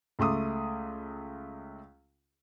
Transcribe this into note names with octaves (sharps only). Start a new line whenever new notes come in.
C#2 A3 C6 D6 D#6